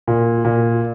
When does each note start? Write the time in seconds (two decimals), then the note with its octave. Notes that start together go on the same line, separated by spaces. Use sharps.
0.08 A#2
0.45 A#2